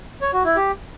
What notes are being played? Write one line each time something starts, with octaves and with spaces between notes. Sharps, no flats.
C#5
F#4
E4
G4